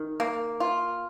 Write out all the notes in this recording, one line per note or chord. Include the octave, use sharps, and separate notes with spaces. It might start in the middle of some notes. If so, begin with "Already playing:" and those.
Already playing: D#3
A#3
F4